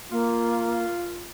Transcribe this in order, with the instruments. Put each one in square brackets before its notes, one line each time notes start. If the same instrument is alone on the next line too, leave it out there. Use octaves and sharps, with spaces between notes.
[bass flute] A#3 [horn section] F4